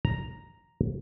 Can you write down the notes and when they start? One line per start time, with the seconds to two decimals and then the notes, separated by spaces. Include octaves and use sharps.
0.05 A#5